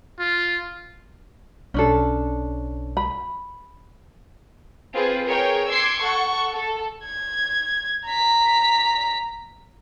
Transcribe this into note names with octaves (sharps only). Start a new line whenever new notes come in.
F4
B1 C#4 D4 A4
B5
C4 F4 G#4 B4
G#4 A#4 C#5 G5
C6 D6 E6 G#6 C7 C#7
A4 F#5 C#6
A4
G#6
A#5 B6